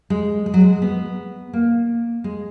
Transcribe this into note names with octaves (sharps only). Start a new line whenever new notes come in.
G#3
G#3
F#3
G#3
B3
A#3
G#3